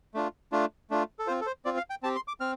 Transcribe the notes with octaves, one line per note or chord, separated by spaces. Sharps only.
A3 D4 F4
A3 D4 F4
A3 D4 F4
A4
C4 F4 C5
A4
C5
C4 F4 D5
F5
G5
C4 G4 A5
C6
D6
C4 F6